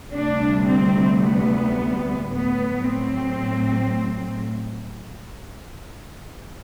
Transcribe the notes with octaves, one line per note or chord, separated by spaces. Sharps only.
D2 C3 G3 D4
C4
B3
A2 F#3 B3
C4